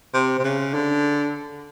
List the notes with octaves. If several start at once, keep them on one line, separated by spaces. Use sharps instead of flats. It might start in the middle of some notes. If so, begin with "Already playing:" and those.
C3
C3
C#3
D3